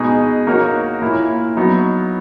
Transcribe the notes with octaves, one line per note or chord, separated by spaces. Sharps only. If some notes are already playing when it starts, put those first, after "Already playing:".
Already playing: B2 G#3 D#4 G#4 D#5
A#3 D#4 F#4 A#4 C#5
A#2 A#3 E4 A#4 C#5
F#3 B3 D#4